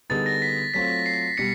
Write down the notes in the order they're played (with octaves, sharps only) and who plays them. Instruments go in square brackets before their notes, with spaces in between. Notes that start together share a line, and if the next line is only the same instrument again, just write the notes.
[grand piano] D3 G3 B3 D#4 G#4 [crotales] A6
[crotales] A#6
B6
[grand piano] F#3 A3 C4 F4 [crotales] B6
[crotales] C7
[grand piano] B2 G3 [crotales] B6 C#7